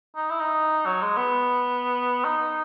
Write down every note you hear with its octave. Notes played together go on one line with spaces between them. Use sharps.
D#4
E4
D#4
F#3
G#3
B3
D#4